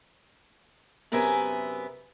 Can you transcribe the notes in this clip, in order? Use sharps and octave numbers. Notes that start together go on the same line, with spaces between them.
F#2 C3 B3 A#4 E5 G#5